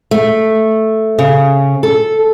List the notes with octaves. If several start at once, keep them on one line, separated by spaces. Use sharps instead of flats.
A3
C#3
A4